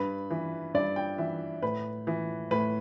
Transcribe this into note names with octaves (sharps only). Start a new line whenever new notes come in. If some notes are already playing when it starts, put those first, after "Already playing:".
Already playing: G2 B4
E3
G2 D5
G5
E3 E5
A2 B4
E3
A2 B4